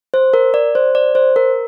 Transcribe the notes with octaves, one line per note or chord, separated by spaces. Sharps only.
C5
A#4
D5
C5
D5
C5
A#4